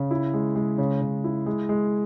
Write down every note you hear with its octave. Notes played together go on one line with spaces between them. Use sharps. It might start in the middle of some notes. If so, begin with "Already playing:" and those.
Already playing: C#3
E4
G#3
G#3
C#3
C#3
E4
G#3
G#3